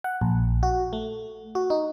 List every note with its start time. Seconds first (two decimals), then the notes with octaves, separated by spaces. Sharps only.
0.04 F#5
0.21 A#1
0.63 F#4
0.93 A3
1.55 F#4
1.70 D#4